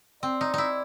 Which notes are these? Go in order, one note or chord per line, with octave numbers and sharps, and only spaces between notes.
C4 D5
D#4
D#4 E4